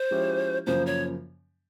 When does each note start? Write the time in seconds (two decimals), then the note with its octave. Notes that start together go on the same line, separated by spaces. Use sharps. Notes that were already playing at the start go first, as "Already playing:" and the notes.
Already playing: C5
0.11 F3 G#3 C#4 E4 G4
0.67 F#2 C#3 F3 A#3 C5
0.86 C#5